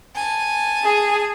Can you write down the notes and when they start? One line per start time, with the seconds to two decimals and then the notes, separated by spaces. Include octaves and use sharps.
0.16 G#5 A5
0.84 G#4